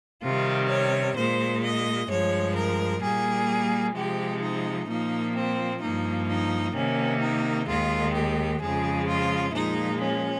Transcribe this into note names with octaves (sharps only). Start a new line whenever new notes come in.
C3 D#3 G3 F4
C#5
A#2 G#3 C5
D#5
G2 F3 G#3 C#5
A#4
A#2 G3 A#3 G#4
C3 F3 G#3 G4
D#4
A#2 F3 A#3 D#4
C4
G2 F3 A#3 D#4
D#4
C3 D#3 A#3 C#4
D#4
D#2 D#3 G#3 F4
G4
F2 C#3 F3 G#3 G#4
F4
A#2 F3 G#3 D#4
C#4